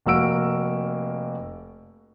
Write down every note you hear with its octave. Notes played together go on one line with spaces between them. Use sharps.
F1 A#3 F#4 E6 D7